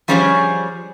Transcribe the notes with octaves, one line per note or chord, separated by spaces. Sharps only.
F3 G3 C#4 G#4 C5 C#5